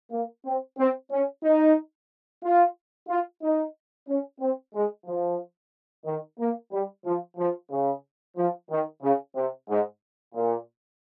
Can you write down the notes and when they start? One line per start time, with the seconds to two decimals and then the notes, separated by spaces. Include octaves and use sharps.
0.11 A#3
0.45 C4
0.78 C4
1.11 C#4
1.43 D#4
2.43 F4
3.08 F4
3.42 D#4
4.08 C#4
4.40 C4
4.74 G#3
5.06 F3
6.05 D#3
6.39 A#3
6.71 G3
7.05 F3
7.37 F3
7.70 C#3
8.37 F3
8.70 D#3
9.02 C#3
9.35 C3
9.69 G#2
10.35 A#2